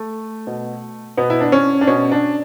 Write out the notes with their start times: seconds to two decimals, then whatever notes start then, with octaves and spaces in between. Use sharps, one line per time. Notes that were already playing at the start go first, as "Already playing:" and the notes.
Already playing: A3
0.47 B2
1.17 B2 B3
1.30 E4
1.40 D4
1.52 C#4
1.81 D4
1.87 B2 C#4
2.12 D4